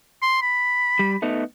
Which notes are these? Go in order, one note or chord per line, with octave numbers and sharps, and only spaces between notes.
C6
B5
G3
A3 B3 D#4